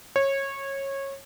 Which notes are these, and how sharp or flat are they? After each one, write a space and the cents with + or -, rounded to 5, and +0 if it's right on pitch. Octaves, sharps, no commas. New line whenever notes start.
C#5 -20